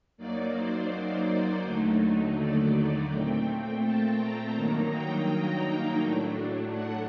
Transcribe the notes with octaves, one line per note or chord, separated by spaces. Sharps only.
F#2 F#3 A#3 D#4 D5
C5
D5
D#2 D3 F#3 A3 D#4
D5
A#2 A3 C4 G5
A5
A#5
G2 D#3 F#3 A#3 D#4 A#5
G5
G5
A2 F#3 A3 D4
F#5